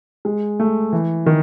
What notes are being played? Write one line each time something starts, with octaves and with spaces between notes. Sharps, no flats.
G#3
A3
E3
D#3